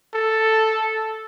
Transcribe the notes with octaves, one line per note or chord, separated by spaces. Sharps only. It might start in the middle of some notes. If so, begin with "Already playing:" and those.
A4